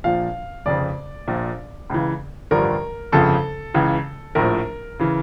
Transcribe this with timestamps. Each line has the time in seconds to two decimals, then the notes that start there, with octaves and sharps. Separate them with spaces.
0.04 A#1 A#2 F3 F5
0.66 F1 F2 C#3 D5
1.28 A#1 A#2 F3
1.90 C#2 C#3 E3
2.51 A1 G2 D3 F3 A#4
3.12 G1 F2 C#3 F3 A4
3.74 C#2 C#3 E3
4.35 A#1 A2 F3 A#4
4.99 C#3 E3